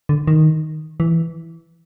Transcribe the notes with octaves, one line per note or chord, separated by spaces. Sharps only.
D3
D#3
E3